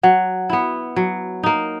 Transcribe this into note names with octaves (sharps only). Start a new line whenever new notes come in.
F#3 F#5
B3 E4
F#3
A#3 D#4